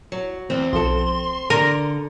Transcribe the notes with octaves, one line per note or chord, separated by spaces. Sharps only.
F#3
E2 C4
B1 F3 A4 C6
D3 A#4